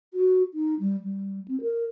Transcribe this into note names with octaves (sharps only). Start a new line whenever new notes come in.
F#4
D#4
G3
G3
C4
A#4